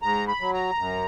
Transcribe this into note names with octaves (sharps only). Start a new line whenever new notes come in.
G#2 A#5
B5
F#3
A#5
F#2